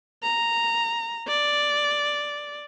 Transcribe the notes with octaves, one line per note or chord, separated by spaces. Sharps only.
A#5
D5